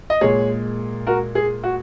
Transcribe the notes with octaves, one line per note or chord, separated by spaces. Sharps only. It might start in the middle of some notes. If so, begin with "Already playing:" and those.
D#5
A#2 G#3 G#4 C#5
F#4 A#4
G#4
F#4